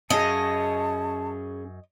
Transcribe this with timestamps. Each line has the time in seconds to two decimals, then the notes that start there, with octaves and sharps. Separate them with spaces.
0.10 F#2 C#4 G#4 D#5 A5